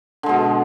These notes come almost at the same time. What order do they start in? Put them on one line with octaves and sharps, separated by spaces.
D3 G#3 B2